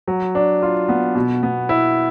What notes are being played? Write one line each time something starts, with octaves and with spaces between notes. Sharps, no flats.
F#3
D4
F4
B3
B2
B3
E4